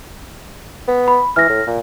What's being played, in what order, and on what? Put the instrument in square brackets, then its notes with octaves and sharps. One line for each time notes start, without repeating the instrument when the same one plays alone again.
[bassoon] B3
[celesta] B5
[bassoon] E3 [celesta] F6 A#6
[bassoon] A2
A#2